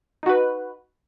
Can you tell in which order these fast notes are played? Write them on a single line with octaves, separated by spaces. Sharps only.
D#4 F#4 B4